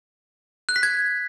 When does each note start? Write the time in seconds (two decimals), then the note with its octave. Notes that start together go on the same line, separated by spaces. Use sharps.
0.69 F#6
0.76 B6
0.83 G#6